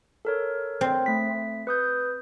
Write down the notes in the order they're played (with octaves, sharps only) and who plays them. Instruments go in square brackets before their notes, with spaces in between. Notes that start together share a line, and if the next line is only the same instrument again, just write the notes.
[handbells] A4 A#4 C#5
[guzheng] C4
[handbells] A3 B6
B4 D#6 G6